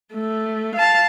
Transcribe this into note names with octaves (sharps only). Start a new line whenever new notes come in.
A3
F5 A5